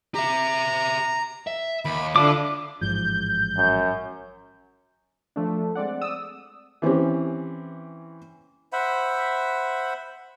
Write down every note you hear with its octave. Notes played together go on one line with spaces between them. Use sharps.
G4 E5 A#5
E5
D#2 B5
D3 D4 E4 F4 D6
A1 G#2 F3 G6
F#2
F3 A3 D4
G#3 C4 D5 F#5
D5 D#6 E6
E3 C4 C#4 G4
C5 E5 F#5 B5